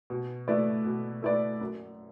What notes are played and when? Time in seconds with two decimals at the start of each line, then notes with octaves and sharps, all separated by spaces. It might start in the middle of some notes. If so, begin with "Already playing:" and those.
0.10 B2
0.48 A3 E4 B4 D5
0.85 B2
1.22 A3 E4 B4 D5
1.61 F#2